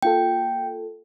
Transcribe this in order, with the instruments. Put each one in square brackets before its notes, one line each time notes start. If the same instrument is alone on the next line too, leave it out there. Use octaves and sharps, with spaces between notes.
[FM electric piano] A#3 F4 A4 [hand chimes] G5